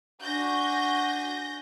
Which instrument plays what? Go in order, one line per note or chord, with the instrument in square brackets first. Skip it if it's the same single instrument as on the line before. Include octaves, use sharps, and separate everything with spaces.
[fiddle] D4 G#5 [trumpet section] F#4 [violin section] G6 A#6